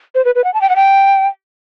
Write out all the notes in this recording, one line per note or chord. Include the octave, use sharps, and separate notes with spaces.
C5
B4
B4
F#5
A5
G5
F#5
G5